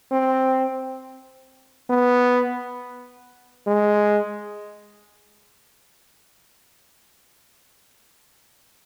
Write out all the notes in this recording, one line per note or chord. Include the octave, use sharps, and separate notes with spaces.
C4
B3
G#3